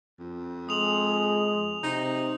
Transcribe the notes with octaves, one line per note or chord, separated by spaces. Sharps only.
F2
G#3 D#6 F7 F#7
C3 D#4